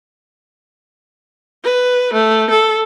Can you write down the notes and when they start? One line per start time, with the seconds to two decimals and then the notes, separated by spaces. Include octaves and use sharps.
1.64 B4
2.13 A3
2.50 A4